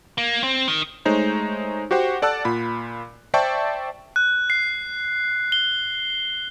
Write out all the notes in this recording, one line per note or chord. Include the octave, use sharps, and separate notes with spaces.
A#3
C4
D#3
G#3 A3 D#4 C5 C#5
F#4 G4 C5 F#5 G5
A4 D5 F#5 A5 E6 F#6
A#2 F4 B5
C5 D5 E5 G5 A5 C#6
F#6
C7
G7